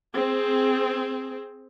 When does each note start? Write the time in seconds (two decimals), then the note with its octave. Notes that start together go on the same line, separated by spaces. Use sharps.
0.14 C4 G#4